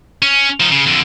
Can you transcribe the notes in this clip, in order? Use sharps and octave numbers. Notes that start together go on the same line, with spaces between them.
C#4
F3 D#4
C#3
F2 D3